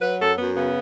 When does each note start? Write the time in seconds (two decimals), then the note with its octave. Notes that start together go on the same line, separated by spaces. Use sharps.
0.01 F#3 B4
0.19 F#2 A4
0.38 F#2 B3
0.56 C#3 B3